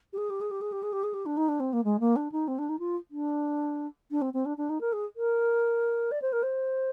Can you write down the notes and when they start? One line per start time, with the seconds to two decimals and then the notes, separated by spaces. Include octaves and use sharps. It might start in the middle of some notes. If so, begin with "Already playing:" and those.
0.13 G4
0.18 G#4
0.30 G4
0.41 G#4
0.51 G4
0.61 G#4
0.72 G4
0.83 G#4
0.92 G4
1.03 G#4
1.13 G4
1.26 D4
1.37 D#4
1.48 D4
1.60 C4
1.73 A#3
1.84 G#3
2.00 A#3
2.16 D4
2.32 D#4
2.48 C4
2.58 D4
2.69 D#4
2.79 F4
3.11 D4
4.11 D4
4.21 C4
4.33 C4
4.45 D4
4.57 D4
4.69 D#4
4.81 A#4
4.93 G#4
5.16 A#4
6.11 D5
6.22 C5
6.32 A#4
6.43 C5